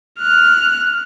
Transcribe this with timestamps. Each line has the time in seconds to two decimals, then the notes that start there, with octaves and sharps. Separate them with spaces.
0.19 F6 F#6